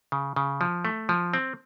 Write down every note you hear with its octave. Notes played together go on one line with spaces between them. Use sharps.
C#3
C#3
F3
A3
F3
C4